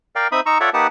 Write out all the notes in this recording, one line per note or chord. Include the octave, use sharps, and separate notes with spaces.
A#4 D5 F5 G5
C4 D#4 E5 B5 D#6
D#4 A#5 C#6 E6
F4 A4 C#5 D5 E5 F#5
A#3 D#4 G4 B4 F#5 A5